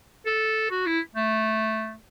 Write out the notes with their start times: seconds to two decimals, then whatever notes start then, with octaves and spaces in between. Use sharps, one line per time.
0.26 A4
0.71 F#4
0.86 E4
1.15 A3